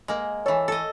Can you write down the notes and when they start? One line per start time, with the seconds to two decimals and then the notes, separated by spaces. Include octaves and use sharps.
0.08 G#3 A#3
0.46 E3 A4 C#5
0.68 A4 D#5